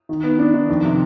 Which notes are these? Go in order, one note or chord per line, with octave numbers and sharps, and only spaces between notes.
D#3
B3
D4
D#3
F2
C3